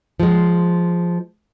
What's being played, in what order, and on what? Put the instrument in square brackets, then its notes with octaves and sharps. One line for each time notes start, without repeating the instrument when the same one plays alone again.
[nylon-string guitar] F3 G#3